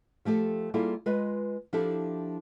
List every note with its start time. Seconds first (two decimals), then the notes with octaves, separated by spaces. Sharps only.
0.25 F3 A3 G4 A4
0.74 G3 A#3 E4 F4 G#4 A4
1.06 G#3 F4 B4 D#5
1.73 F3 D4 E4 G4 A4